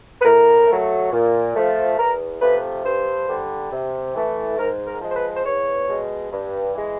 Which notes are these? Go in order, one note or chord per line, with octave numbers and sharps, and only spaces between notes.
B4
A2 A#4
F#3 A3
A#2
F3 A3
E2 A#4
C3 F3 A3 B4
G2 C5
D3 G3
C3
E3 A3
G#2 A#4
A#4
F3 G#3
C5
B4
C5
E2 C#5
B2 G#3
G2
E3 G#3